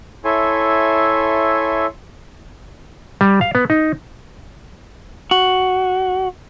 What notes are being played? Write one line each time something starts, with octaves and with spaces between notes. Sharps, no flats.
E4 A4 C#5 E5 G#5 C6
G3
F5
B3
D#4
F#4